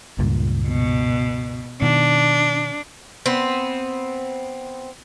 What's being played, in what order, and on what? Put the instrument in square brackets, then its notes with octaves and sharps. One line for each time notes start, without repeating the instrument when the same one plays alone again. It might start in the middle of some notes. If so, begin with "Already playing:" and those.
[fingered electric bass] C#2 G2 A#2
[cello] B2
[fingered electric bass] B2 D#3 [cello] D4
[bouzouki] B3 C4